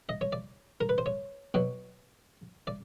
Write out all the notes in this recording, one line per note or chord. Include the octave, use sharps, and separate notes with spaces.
D#5
C#5
D5
A#4
B4
C5
C#5
B2 F#3
D5